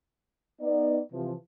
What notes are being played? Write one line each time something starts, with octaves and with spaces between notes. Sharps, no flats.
B3 D#4 D5
C3 E3 F3